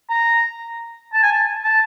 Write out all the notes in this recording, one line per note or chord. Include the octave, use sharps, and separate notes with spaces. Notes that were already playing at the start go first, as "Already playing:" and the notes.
A#5
A5
G#5
A5
A5